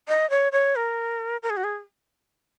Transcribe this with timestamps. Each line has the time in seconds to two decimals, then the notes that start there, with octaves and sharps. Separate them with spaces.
0.08 D#5
0.30 C#5
0.52 C#5
0.76 A#4
1.43 A#4
1.50 G#4
1.57 F#4
1.64 G#4